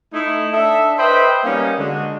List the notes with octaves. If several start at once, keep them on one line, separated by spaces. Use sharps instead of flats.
A3 D#4 E4
D4 A4 D#5 E5
B4 C5 D#5 E5 G5 B5
G3 A#3 B3 C#4 D#4
D3 G#3 F#4